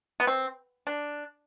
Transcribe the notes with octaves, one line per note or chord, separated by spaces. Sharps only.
B3
C4
D4